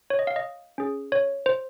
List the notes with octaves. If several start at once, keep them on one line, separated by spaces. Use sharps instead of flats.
C#5
D#5
F5
D#5
C#4 G#4
C#5
C5